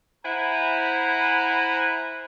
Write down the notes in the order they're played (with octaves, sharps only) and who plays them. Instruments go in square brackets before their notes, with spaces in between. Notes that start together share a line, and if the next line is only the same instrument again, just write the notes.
[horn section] E4 C5 F#5 G#5 A#5 B5